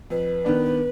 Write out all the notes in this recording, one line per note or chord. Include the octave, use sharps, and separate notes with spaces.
F2 B4
D#3 B3 D4